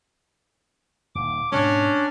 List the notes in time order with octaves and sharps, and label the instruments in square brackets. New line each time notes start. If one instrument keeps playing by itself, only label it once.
[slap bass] D#1 D#2 [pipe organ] D6
[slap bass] G#2 B2 G#3 [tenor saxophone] C#4 [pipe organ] D4